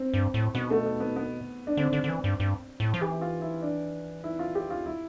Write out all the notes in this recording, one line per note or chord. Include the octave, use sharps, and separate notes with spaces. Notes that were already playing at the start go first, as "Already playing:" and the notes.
Already playing: C4
G2
A2
B2 B3
A3
B3
B3
B3
D4
D3 C4
D3
D3
E3
G2
G2
A2
F3
E3 G4
F4
E4
D4
E4
F4
G4
F4
E4